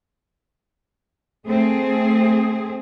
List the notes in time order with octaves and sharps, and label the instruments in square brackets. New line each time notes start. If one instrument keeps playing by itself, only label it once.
[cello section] A3 C4 G#4